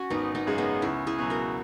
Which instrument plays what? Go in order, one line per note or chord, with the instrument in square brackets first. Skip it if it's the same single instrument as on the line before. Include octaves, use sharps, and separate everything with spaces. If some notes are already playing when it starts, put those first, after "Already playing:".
Already playing: [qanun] C#4 F#4
[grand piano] G#1 [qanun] B3 D#4
[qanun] B3 D#4
[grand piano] F#2 C#3 G#3
[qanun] B3 D#4
[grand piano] C#2 [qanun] C#4 E4
[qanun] E4 G#4
[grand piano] B2 F#3
[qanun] F#4 A#4